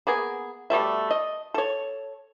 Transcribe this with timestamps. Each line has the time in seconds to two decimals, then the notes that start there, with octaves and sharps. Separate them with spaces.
0.07 A#3 B3 G#4
0.70 B2 G3 A3 E5
1.11 D#5
1.54 A4 C#5